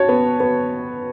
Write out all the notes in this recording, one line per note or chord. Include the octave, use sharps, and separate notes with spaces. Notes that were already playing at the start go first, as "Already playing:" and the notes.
Already playing: F#4 C#5 A5
B3
B3